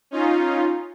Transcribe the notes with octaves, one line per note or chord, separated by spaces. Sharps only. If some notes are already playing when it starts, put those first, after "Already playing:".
C#4 D#4 F4